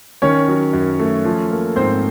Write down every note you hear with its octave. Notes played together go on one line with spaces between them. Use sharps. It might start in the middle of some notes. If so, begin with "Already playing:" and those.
D#3 C#4 C#5
F#3
F#2
A3
F3
A#3
G#2 C4 C5